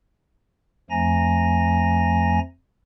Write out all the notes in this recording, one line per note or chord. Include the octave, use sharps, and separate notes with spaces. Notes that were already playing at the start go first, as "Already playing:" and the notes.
F2 F3 A3 G#5 A#5 A#6